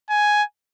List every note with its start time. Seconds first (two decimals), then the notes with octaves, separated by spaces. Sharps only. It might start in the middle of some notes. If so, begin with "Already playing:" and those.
0.10 G#5